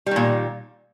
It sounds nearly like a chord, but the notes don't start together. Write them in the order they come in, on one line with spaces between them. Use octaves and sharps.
G3 D#3 A#2